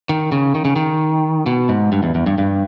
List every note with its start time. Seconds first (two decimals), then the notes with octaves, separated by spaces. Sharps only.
0.09 D#3
0.32 C#3
0.55 D#3
0.65 C#3
0.76 D#3
1.46 B2
1.69 G#2
1.92 G2
2.03 E2
2.15 E2
2.26 G2
2.38 G2